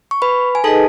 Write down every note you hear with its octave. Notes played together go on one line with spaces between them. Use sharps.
C#6
B4 B5
G#5
D#4 G#4 A4 B4 D#5 A5